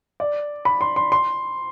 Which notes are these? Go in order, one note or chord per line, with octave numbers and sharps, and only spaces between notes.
D5
B5
C6
C6
C6